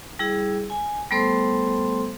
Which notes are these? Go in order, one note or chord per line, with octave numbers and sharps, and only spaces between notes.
G3 E4 G#4
G#5
G3 A3 B3 A4 C5 C6